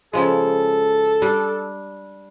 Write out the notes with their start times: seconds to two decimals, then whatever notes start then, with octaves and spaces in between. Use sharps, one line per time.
0.13 C#3 F3 G#3 A4
1.22 G3 D4